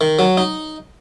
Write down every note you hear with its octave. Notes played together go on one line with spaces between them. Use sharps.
D#3
F#3
D#4